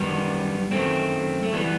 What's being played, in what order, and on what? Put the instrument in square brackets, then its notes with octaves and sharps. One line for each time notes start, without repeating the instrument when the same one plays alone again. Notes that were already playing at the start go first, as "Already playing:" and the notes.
Already playing: [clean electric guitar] F#2 D#3 G3 B3
F#2 D#3 A3 C4
A3
E3 G3 B3